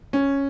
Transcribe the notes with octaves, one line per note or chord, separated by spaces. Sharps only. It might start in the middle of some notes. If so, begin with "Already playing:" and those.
C#4